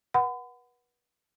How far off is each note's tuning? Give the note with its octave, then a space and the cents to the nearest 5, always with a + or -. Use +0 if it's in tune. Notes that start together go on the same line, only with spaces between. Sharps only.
B4 -35 F#5 +0 B5 +40